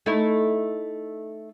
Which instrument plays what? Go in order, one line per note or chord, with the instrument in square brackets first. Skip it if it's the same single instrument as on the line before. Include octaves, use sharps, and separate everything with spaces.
[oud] A3 D#4 E4